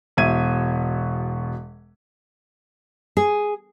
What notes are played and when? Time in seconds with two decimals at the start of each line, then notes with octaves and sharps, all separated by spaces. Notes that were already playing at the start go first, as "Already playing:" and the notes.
0.17 E1 B2 E5 G#6 D#7
3.17 G#4